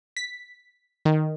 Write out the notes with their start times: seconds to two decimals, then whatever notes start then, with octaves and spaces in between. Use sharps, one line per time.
0.17 B6
1.05 D#3